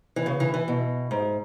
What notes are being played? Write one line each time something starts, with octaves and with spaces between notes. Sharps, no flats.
E3
C#3
E3
E3
B2
G#2